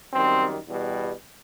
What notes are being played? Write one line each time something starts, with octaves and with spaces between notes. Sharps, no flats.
F#2 D#3 G3 C4
E2 B2 G3